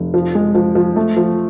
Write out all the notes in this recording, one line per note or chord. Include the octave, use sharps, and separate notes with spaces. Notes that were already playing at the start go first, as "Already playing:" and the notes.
Already playing: F1
F3
G#3
F3
F3
A3
F3